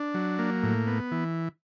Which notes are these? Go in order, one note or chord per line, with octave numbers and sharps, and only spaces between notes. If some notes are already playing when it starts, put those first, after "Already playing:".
Already playing: D4
F#3
A#3
A2
B3
E3